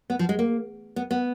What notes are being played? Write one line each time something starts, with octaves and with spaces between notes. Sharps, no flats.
B3
F3
G#3
A#3
B3
B3